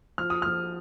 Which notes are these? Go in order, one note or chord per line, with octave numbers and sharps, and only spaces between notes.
F3 F6
D#6
F3 F6